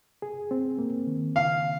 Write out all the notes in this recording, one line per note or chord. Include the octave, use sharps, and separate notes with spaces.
G#4
C4
A#3
D#3
C#3 F5